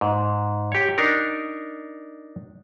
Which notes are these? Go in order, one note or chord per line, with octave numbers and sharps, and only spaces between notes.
G#2
G4 C#5
D4 D#4 A#4